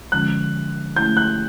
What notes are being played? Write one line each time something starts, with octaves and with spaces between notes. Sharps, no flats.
D3 F3 G#3 C#4 F4 F#6
A3 C#4 E4 G6
F#6